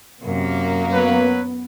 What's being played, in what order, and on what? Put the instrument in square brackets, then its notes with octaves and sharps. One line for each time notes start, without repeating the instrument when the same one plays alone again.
[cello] F#2 [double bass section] C3 [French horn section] A#3
[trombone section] F#3 B4 [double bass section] B3